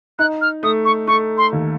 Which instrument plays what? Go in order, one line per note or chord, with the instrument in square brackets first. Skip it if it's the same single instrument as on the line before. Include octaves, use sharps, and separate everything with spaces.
[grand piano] D#4 [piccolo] F#6
[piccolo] F6
[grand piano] A3 [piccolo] D#6
[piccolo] C#6
[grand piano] A3 [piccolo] C#6
[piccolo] C6
[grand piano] D#2